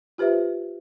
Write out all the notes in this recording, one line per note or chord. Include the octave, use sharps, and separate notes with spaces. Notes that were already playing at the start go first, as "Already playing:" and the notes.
F4 G4 B4 C5 E5